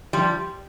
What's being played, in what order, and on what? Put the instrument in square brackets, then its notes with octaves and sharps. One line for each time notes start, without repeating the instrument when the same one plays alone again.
[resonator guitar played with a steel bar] F3 G3